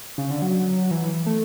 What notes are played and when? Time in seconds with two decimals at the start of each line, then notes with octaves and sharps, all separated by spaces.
0.18 C#3
0.31 D3
0.42 F#3
0.91 E3
1.26 A3